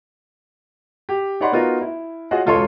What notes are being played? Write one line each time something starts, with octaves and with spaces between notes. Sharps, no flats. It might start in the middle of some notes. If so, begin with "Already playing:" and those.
G4
D#4 C#5 D5 F#5 B5 C6
B3 D#4 F4 F#4 A#4
E4
F4 F#4 G#4 C#5 D#5 F#5
E1 C#2 F4 A4 C#5 C6